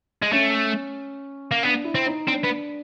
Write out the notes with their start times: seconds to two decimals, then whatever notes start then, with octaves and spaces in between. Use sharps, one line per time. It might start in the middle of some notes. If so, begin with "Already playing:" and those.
0.23 G#3
0.33 A3 C#4
1.52 A#3
1.63 B3 D4
1.84 E4
1.95 C4
2.06 D#4
2.28 C4 D4
2.44 B3